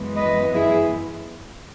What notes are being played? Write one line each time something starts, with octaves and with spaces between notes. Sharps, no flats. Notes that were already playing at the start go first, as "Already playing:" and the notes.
Already playing: F#2 E3 G#3 B3
B4 D#5
E4 G#4